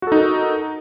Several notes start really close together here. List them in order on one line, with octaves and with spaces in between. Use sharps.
F#4 A4 D#4 A#4